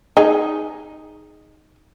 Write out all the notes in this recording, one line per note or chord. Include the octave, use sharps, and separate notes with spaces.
D#4 G#4